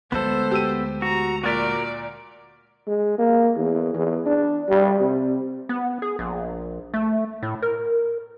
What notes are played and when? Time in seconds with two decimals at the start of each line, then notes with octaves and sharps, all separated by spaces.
0.12 D2 G#3 B3 A4 C5
0.51 G4 E6 D#7
1.02 F#4 A#5
1.44 A#2 F#4 A#4 D5 A6 B6
2.87 G#3
3.18 A#3
3.56 E2
3.94 E2
4.26 D4
4.69 G3
5.00 C3
5.69 B3
6.02 G#4
6.19 A#1
6.94 A3
7.43 A2
7.62 A#4